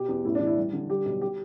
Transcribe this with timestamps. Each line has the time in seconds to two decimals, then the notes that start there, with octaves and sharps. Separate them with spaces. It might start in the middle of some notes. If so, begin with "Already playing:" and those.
Already playing: B2 G4
0.08 E2
0.25 A1 E4
0.35 D4
0.40 E3
0.47 E4
0.56 G3
0.73 D3
0.89 G3 G4
1.05 B1
1.21 G4